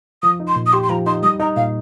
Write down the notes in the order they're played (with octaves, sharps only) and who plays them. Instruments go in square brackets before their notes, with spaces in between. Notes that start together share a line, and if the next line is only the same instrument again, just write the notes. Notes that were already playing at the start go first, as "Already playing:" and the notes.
[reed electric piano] F3 [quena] D#6
[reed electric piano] D#4
[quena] C6
[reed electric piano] A#2
[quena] D#6
[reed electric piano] G4 [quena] C6
[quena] C6
[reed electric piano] F3 [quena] A#5
[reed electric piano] D#4 [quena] C6
[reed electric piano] G3 [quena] D#6
[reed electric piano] D#4 [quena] A#5
[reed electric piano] A#2 [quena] F5